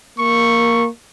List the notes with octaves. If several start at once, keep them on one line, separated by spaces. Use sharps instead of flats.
A#3 C#6